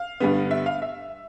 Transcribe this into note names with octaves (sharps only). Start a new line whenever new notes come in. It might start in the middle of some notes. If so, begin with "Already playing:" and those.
Already playing: F5
G2 D3 G3 B3
E5
F5
E5